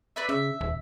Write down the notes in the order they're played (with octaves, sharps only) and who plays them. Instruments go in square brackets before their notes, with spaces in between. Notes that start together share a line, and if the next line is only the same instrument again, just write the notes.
[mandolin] D4 B4 E5
[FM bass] C#3 [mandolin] E5
[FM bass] D#1